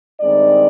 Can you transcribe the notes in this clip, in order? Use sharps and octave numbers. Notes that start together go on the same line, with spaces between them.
G2 D#3 G#3 C4 D#4 D5